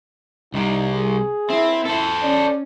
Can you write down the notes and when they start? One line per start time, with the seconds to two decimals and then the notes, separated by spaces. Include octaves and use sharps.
0.54 C2 C3 D#4
0.92 G#4
1.50 C4 E4 E5
1.85 A4 C5
2.23 C#4 D5